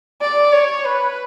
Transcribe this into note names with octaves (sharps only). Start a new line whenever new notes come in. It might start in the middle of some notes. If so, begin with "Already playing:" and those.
D5
C#5
B4